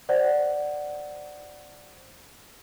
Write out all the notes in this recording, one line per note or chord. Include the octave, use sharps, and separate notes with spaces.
C5 D5 F#5